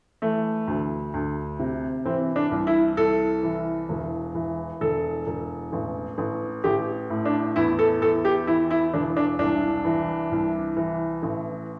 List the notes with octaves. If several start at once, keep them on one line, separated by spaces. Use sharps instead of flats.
E3 A3
D2
D2
C3
E3 C4
D4
C2
E4
C2 A4
E3
E1
E3
E1 A4
E1
A1
A1
A1 G4
A2
D4
E2 E4
A4
E2 A4
G4
E3 E4
E4
E1 D4
D4
C2 D4
E3
C2
E3
A1